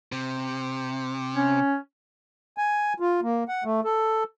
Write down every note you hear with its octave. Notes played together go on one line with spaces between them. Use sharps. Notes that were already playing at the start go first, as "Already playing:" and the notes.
C3
C#4
G#5
F4
A#3
F#5
A3
A4